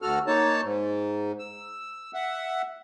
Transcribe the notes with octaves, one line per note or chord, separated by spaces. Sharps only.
D2 F#4 A4 F6
A#3 D#4 C#5 A5
G#2
E6
E5 F#5